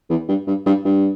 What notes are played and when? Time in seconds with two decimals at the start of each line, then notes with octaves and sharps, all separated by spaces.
0.10 E2
0.28 G2
0.47 G2
0.66 G2
0.85 G2